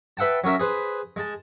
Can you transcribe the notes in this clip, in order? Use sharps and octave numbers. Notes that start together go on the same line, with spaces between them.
B4 E5 F#5 G5 A5
F#3 C#4 A#4 E5
G#4 B4 C5
G#3 A5